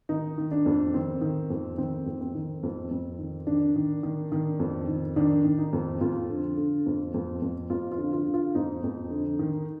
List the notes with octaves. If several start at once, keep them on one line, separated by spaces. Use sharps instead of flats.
D#3 D#4
D#3
D4
F2
D#3 C4
D#3
F2
D#3 C4
F2
C4
D#3
F2
F2
D#3
D#3 D4
D#3
D#3
D#3
F2
D#3
D#3 D4
D#3
D#4
F2
F2 F4
D3
D3
F2
F2
F2
F2 F4
F4
D3
F4
D3
F4
F2 D#4
F2
D3
D#3